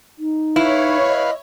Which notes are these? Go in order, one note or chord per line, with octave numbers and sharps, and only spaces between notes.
D#4
E4 B4 C#5 F5
D#5